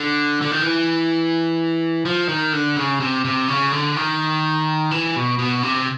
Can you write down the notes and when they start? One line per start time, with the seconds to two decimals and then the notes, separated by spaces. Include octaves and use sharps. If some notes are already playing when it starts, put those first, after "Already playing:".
Already playing: D3
0.42 D3
0.51 D#3
0.61 E3
2.05 F3
2.29 D#3
2.53 D3
2.76 C#3
3.00 C3
3.25 C3
3.48 C#3
3.72 D3
3.96 D#3
4.91 E3
5.16 B2
5.39 B2
5.63 C3